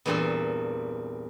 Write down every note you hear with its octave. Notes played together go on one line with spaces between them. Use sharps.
E2 G2 A#2 C4 A4 C5